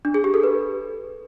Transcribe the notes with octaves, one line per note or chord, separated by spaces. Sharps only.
D4
G#4
G4
A4
B4